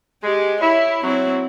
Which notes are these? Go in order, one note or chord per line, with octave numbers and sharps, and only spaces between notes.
G#3 G4
E4 C#5
F#3 C4 E4